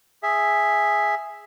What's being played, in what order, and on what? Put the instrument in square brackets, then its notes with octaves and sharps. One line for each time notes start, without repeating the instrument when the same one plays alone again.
[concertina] G#4 E5